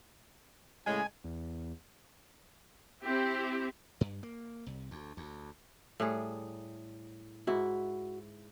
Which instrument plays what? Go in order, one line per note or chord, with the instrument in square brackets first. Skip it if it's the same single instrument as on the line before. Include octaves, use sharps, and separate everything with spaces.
[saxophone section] A2 C#3 G#3 [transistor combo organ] G#5
[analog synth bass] E2
[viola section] C4 E4 G4
[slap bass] G2
A#3
C2
D2
D2
[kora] A2 G3 G#4
[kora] G#2 E4 [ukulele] F#4